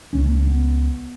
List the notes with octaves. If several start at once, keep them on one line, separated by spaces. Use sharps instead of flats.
C#2 C#3 C#4
A#3
C#4
B3